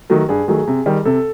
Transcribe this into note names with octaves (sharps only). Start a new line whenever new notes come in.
D#3 F#3 A3
G2 G#4
D#3 F#3 A3 G#4
C3
D#3 G3
C3 A4